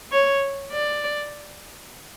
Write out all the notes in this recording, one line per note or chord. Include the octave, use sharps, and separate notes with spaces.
C#5
D5